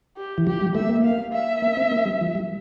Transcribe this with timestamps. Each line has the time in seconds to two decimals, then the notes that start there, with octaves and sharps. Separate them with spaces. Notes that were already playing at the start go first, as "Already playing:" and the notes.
0.17 G4
0.38 E3
0.46 F3 G4
0.61 G3
0.75 A3 E5
0.89 A#3
1.04 F5
1.33 E5
1.62 A#3
1.77 C4
1.91 A#3
2.06 G3
2.21 F3
2.35 G3